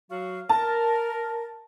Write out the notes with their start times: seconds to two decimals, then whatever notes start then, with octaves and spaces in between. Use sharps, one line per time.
0.11 F#3 F#4 F5
0.49 A#4 A5